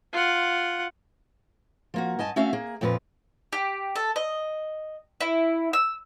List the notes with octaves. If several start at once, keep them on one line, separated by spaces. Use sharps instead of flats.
F4 F#5
F3 A#3 F#4
G2 D#5 G#5 A5
A3 C#4 F#4 E5 F5
A#3 G#4
F2 A#2 F3 G4 B4
G4
A4
D#5
E4
E6